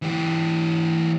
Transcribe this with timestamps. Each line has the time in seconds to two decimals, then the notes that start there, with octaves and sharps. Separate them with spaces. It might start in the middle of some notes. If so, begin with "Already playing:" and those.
0.02 E3 G4